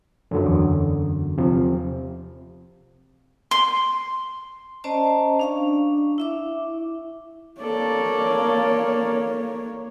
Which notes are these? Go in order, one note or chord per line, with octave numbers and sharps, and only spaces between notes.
F#2 D3 F#3
E2
C3 F3
C6
C#4 C5 D5 D#5 A5 A#5
D4 F5 C#6
E4 E5 D6
A#3 A4 C#5 D5